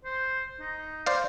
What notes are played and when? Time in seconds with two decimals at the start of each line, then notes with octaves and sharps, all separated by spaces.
0.05 C5
0.60 D#4
1.06 C5 D5 F5